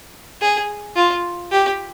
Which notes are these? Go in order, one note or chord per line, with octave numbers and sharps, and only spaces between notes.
G#4
F4
G4